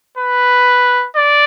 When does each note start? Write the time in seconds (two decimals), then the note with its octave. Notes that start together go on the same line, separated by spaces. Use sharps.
0.17 B4
1.16 D5